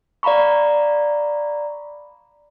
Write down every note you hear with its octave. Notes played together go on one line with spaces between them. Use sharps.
D5 F5 A#5 B5 C#6